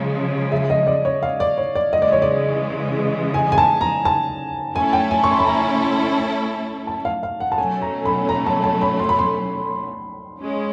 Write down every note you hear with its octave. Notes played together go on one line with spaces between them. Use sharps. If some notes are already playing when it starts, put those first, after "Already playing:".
Already playing: C#3 F3 G#3
E5
D#5
D5
C#5
F5
D5
C#5
D5
C#3 E3 G#3 D#5
D5
C#5
D5
G#5
G#5
A5
A#5
A5
A3 C#4 E4 A4 G#5
G5
G#5
C#6
C6
B5
A#5
A5
F5
F5
F#5
A5
B2 F#3 A3 C#4 G#5
A#5
B5
A#5
A5
A5
B5
C6
B5
C6
G#3 C#4